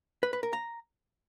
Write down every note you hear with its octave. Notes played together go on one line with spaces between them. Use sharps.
B4
B4
A#4
A#5